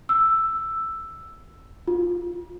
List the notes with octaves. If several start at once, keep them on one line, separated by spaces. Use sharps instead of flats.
E6
F4